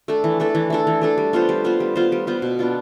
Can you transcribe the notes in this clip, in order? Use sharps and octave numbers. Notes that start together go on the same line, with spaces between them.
A3 D4 A4
E3
A3 D4 A4
E3
A3 D4 A4
E3
A3 D4 A4
G3
B3 F4 C5
G3
B3 F4 C5
G3
B3 F4 C5
G3
B3 F4 C5
B2
B3 D4 F4